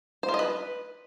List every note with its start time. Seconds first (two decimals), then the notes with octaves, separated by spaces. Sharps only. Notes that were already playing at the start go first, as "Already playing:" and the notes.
0.23 C5
0.29 F4
0.34 D#5
0.39 B4